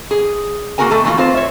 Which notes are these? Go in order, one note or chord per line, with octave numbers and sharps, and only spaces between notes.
G#4
A#3 C4 F#4 G#4 A#4 G#5
B2 A3 A4
E3 A3 A#3 D#4 F4
C4 F4 B4 C5
C#5 E5